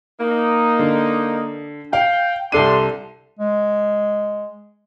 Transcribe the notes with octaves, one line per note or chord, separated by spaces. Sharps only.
A#3 D#4
D3
F5 G5
C2 D4 A4 C6 D#7
G#3